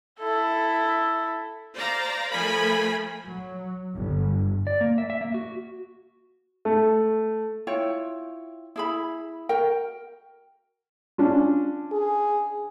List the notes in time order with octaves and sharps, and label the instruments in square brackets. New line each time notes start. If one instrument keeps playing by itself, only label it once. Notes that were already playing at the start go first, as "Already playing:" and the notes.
[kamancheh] E4 A4
[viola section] C5 D5 F5 A#5
F3 A3 A#4 G#5 B5
[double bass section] F#3
G1
[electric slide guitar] D5
A#3
E5
E5
A#3
F#4
[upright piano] A3
[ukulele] E4 F4 C#5 G5
E4 G#4 B5
F#4 A#4 G5
[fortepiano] C#4 D4 F4
[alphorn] G#4